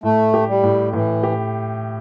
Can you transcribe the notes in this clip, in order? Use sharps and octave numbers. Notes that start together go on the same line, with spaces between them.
A2 A3
G4
G3
A2
A2 E3
G4